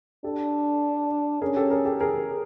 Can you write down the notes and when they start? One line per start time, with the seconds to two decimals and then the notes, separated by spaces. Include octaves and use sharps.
0.24 D4 G4 A4
1.42 C#4 G#4 A#4
1.56 G4 A4
1.71 G#4 A#4
1.85 G4 A4
2.01 G#4 A#4